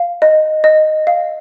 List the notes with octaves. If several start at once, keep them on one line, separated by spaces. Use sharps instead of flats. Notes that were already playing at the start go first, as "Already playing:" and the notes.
Already playing: F5
D#5
D#5
F5